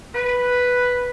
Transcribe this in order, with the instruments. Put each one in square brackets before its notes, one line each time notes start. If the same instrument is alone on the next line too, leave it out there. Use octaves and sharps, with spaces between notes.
[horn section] B4